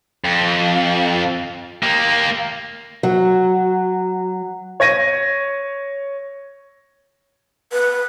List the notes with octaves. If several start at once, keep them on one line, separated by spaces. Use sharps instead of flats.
F2
A#3 G4
F#3
C#5 G#6 A#6 D#7
B4